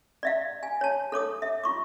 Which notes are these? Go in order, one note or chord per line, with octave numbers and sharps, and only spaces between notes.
D5 E5 F5
G#5
C#5 A5
A4 C#5 D6 D#6
E5
F4 C#6 D6